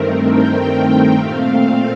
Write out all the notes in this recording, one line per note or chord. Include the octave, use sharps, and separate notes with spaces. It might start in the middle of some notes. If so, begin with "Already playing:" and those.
Already playing: G2 D#3 A3 C4 A#4
G5
A#2 A3 C4 F5